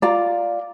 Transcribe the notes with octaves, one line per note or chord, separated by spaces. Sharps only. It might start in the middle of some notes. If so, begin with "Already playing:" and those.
F4 D5 A#5